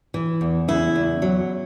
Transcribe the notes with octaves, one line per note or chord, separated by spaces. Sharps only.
E3
E2
C#3 E4
E2
F#3